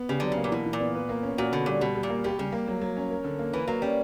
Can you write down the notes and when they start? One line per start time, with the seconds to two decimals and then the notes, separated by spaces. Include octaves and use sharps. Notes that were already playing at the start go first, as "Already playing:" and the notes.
Already playing: B3
0.09 C#3 G4
0.20 D3 F#3
0.32 C#3
0.37 A#3
0.44 A#2
0.51 B2 E3
0.66 E3
0.73 A#2
0.80 B3
0.94 B4
1.09 A#3
1.23 C#4
1.38 A#2 F#4
1.52 B2 D3
1.66 A#2 G3
1.81 B2 G3
1.95 G3
2.03 A#2
2.10 A#3
2.24 B2 G4
2.38 C#3 G3
2.53 A#3
2.68 F#3
2.81 F#3
2.97 C#4
3.11 A#4
3.24 D3
3.39 A#3
3.53 E3 B4
3.67 F#3 A#3
3.82 G3 C#4